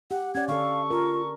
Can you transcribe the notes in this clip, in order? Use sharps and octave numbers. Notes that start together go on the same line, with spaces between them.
G4 F#5
C#4 D5 F#5 G#6
D3 D4 A4 F5 C#6
F4 A#4